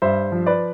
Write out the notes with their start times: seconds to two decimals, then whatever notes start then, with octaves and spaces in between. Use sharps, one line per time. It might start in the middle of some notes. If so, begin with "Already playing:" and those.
0.02 G2 C5 E5
0.32 F3
0.46 B4 D5